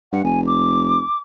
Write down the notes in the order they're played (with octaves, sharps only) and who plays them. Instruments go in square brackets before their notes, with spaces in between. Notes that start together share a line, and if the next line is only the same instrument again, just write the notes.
[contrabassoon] G2 [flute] F#5
[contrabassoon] F1 [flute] G#5
[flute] D6